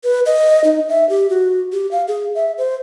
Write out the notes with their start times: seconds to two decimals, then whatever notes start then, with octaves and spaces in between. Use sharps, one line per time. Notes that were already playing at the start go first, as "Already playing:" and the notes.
0.04 B4
0.26 D#5
0.64 D#4
0.89 E5
1.09 G4
1.30 F#4
1.72 G4
1.91 F5
2.08 G#4
2.35 E5
2.58 C5